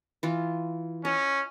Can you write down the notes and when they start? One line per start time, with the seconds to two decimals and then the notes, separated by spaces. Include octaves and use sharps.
0.23 E3 F4
1.05 C#4 D#5